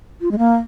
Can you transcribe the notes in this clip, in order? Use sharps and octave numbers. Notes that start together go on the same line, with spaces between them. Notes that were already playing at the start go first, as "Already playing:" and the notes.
F4
G#3
A#3